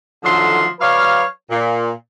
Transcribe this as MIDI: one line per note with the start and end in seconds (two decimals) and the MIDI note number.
0.24 0.66 50
0.24 0.66 51
0.24 0.66 53
0.24 0.66 54
0.24 0.66 57
0.24 0.66 84
0.80 1.24 54
0.80 1.24 71
0.80 1.24 73
0.80 1.24 74
0.80 1.24 77
1.51 1.91 46